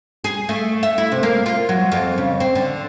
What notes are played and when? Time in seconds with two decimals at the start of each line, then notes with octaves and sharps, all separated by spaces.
0.24 G#4
0.49 A3
0.83 E5
0.98 E4
1.12 C3
1.23 A#3
1.46 F4
1.69 F#3
1.92 F2
2.18 C#3
2.40 C4
2.55 D3